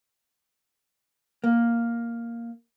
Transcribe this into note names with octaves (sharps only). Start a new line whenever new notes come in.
A#3